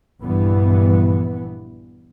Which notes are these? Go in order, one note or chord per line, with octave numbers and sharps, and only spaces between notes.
A#1 G2 E3 B3